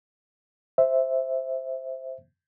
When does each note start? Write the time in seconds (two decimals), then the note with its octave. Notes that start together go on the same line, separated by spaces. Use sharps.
0.78 C5 E5